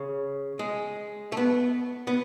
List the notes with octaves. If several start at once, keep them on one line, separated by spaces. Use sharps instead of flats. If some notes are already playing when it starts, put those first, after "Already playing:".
Already playing: C#3
G#3
A3
B3
B3